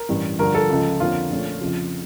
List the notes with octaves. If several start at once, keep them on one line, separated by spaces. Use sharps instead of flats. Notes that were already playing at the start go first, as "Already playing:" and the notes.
Already playing: A#4
A1 G2 E3
G2 D3 F3 A#4
A4
C#2 C#3 F3
F2 D3 F3 A#3 C#4 F4
A#1 A#2 A3 C#4
F2 C#3 F3